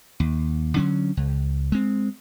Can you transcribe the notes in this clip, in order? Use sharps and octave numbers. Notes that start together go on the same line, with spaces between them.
D#2
D3 F#3 C#4
C#2
G#3 C4